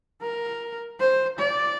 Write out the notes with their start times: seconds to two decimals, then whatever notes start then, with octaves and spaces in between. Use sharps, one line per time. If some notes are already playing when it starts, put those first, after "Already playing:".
0.22 A#4
0.99 C5
1.39 D5